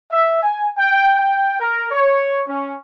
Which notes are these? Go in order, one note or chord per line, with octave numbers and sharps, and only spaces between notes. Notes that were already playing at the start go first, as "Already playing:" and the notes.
E5
G#5
G5
G5
A#4
C#5
C#4